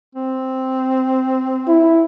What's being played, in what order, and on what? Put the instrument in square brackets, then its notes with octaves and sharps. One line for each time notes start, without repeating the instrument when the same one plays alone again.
[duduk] C4
[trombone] E4